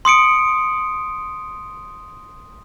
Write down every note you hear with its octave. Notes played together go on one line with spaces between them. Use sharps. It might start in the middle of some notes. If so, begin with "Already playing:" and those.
C6 D#6 C#7 D7